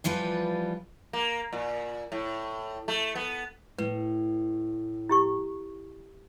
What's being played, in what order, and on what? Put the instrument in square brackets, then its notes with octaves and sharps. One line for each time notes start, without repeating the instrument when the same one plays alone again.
[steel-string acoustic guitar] E3 F3 G3 F4 B4
[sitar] A#3
A#2
A2
A3
B3
[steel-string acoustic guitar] A2 [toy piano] B4
[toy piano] E4 G4 C#6